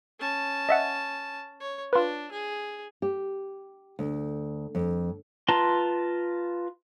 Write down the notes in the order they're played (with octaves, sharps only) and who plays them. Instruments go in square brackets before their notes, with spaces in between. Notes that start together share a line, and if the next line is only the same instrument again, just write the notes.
[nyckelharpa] C#4 A5
[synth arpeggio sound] D#5 E5 F#5
[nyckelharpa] C#5
[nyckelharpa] D4 [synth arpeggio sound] F4 B4
[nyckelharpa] G#4
[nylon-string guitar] G4
D2
F2
[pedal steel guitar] F4 B4 A5 A#5 C6